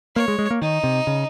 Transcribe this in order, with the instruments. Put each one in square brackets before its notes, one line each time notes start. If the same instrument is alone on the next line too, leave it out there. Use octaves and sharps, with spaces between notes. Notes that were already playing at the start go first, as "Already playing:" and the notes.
[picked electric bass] A#3 [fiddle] C#5
[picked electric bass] G#3
G#3
A#3
[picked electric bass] D#3 [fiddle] D#4
[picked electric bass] C3
C#3